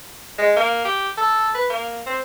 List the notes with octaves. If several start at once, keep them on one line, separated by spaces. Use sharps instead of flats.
G#3
A#3
G4
A4
B4
A#3
C4